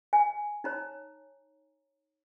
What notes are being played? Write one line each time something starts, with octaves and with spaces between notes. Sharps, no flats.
G#5
D#4 C#5 A#5